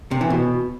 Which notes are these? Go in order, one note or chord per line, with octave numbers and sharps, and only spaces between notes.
C3
E3
B2